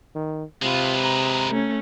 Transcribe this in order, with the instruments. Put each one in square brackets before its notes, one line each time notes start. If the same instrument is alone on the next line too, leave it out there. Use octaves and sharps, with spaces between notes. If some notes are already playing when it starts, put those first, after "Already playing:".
[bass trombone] D#3
[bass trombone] C3 [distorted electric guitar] G#3 B4 [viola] F4
[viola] A#5
A3 C#4